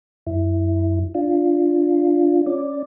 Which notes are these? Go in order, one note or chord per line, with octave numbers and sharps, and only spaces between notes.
F#2 E4
D4 F4
C#4 D5